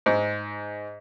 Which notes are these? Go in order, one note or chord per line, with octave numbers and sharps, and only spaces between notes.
G#2